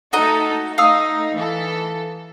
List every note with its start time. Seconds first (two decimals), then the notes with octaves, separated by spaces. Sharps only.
0.13 A3 D#4 F#4 A4 D#5 A#5
0.78 A3 D#4 F5 D#6 E6
1.35 E3 A4